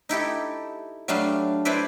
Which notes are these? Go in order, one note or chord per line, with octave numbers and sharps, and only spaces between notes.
D#4 E4 G4 A4
F#3 G3 A3 D4 F5
E4 B4 C5 D5 E5